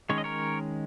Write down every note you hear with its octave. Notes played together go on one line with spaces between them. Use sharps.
D#3 G#3 C#4 C#5
D#5
A#4 C#5